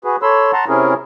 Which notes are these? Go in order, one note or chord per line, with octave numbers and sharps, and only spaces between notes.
F#4 G#4 B4
A4 C#5 B5 C6 E6
F#5 A5 A#5 C6
C3 C4 C#4 E4 G#4 A#4